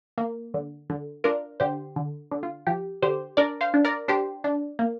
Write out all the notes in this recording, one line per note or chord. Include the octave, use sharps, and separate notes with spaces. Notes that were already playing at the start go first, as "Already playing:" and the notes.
A#3
D3
D3
D4 F4 A#4
D3 G4 C5
D3
D3
F4
F3 G4
D3 G4 C5
D4 A#4 D5
C5 F5
D4
A#4 D5
D4 G4 C5
D4
A#3